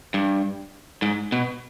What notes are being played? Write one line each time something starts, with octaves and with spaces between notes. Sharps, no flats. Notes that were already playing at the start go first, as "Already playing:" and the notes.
G2
G#2
B2